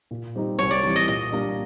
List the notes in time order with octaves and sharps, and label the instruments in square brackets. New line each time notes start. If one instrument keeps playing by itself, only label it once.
[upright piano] A#2
G3 C4 D#4
[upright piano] C2 [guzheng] C#5
[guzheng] D5
[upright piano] C3 E3 G3
[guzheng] D#5
[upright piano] A#2 [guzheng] D#5
[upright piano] G3 A#3 D4